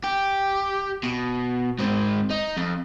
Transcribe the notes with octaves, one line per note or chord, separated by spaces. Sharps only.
G4
B2
G#2 C4
D#4
F2